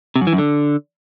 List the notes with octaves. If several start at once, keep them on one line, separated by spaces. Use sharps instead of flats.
C3
F#2
E3
F#2
D3